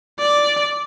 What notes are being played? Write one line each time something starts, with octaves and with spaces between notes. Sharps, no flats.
D5